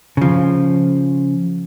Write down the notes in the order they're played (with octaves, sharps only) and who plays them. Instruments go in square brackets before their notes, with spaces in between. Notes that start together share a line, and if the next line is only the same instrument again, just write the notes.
[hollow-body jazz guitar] C#3 F3